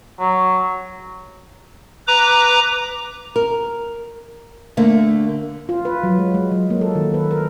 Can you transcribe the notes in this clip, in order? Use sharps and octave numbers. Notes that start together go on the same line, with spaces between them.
F#3
B4 A#5 D6
A#4
D3 A3 A#3
F4
B4
F#3
G#3
G#3
F#3
A#3
A4
D#3
B4
A#4